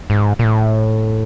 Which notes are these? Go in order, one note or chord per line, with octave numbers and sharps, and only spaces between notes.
G#2
A#2
A2